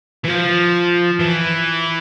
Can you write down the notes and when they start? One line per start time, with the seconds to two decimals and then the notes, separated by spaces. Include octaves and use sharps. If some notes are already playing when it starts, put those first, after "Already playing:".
0.24 E3
0.28 F3
1.19 E3